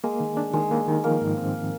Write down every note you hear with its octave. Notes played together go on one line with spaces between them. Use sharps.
G#3 A#3
D#3
D4
D#3 G#3
A#3
D#3
F3 A#3
G#2
C4